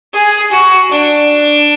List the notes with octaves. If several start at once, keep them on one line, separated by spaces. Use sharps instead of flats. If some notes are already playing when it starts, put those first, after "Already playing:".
G#4
F#4
D4